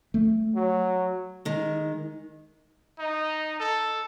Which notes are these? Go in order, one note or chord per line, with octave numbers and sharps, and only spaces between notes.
A3
F#3
D#3 G#3
D#4
A4